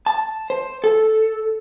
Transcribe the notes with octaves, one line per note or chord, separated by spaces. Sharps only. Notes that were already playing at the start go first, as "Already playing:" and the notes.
A5
C5
A4